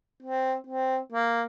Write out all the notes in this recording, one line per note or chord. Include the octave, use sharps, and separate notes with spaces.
C4
C4
A#3